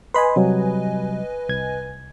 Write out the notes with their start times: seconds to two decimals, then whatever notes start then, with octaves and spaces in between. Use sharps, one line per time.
0.14 B4 D#5 G#5 B5 C6
0.36 C3 F#3 G3
1.49 C2 G#6